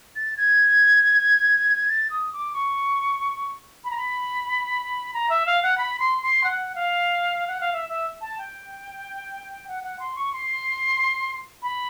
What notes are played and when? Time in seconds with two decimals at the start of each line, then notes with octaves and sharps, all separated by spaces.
0.16 A6
0.37 G#6
1.88 A6
2.10 D#6
2.33 D6
2.54 C#6
3.84 B5
3.91 A#5
3.97 B5
5.14 A#5
5.30 E5
5.46 F5
5.63 F#5
5.78 B5
5.99 C6
6.22 C6
6.44 F#5
6.75 F5
7.48 F#5
7.61 F5
7.73 E5
7.89 E5
8.21 A5
8.38 G5
9.68 F#5
9.83 F#5
10.00 C6
10.16 C#6
10.33 C6
11.62 B5